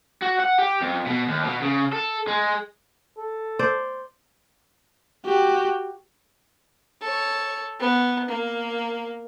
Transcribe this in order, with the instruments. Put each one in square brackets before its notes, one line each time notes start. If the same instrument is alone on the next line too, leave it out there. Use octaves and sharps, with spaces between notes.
[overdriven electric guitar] F#4
F#5
G4
F2
B2
D#2
B2
C#3
A4
G#3
[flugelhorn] A4
[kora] C5 D5
[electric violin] F#4 G4
[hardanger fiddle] A4 C#5
B3
A#3